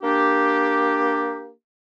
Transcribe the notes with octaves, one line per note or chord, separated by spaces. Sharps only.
A#3 D4 G4